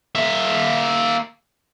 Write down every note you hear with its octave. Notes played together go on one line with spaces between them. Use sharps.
A#3 E5